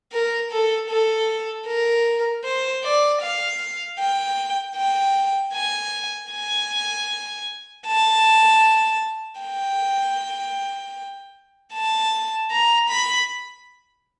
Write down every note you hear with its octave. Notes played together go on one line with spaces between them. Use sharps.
A#4
A4
A4
A#4
C5
D5
F5
G5
G5
G#5
G#5
A5
G5
A5
A#5
B5